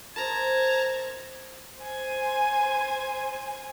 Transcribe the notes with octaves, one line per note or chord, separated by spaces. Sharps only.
A#4 C5 D#5 A5 A#5 G#6
C5 G#5